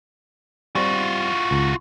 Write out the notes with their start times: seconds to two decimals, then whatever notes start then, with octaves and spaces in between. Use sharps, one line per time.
0.75 G3 C4 F4 F#4
1.51 C#2